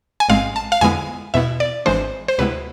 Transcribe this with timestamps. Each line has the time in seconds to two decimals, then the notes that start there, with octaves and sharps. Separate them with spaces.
0.20 G#5
0.29 A1 G#2 G#3 C4 F5
0.56 A5
0.72 F5
0.81 F2 D3 G#3 B3 E4 G#5
1.34 E2 B2 B3 E4 E5
1.60 D5
1.86 G#1 G#2 E3 G#3 D4 C5
2.28 C5
2.38 D2 C3 G#3 B3 E4 B4